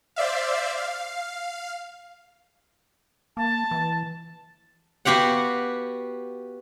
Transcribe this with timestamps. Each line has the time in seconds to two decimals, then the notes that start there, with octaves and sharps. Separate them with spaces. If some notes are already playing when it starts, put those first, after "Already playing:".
0.16 C5 D5 E5 F5
0.77 F5
3.37 A#3 A5
3.71 E3
5.05 B3 F#4 G4 F5 F#5